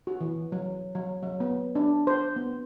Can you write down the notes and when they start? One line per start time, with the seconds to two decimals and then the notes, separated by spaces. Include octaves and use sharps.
0.07 F#4
0.21 E3
0.52 F#3
0.95 F#3
1.23 F#3
1.40 B3
1.75 D4
2.07 C5
2.36 B3